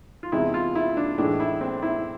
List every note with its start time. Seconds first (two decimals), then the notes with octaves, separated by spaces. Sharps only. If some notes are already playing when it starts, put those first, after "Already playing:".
0.23 F4
0.32 E2 C3 G#3 E4
0.54 F4
0.75 E4
0.97 D4
1.18 A2 E3 G#3 D4
1.40 E4
1.61 C4
1.82 E4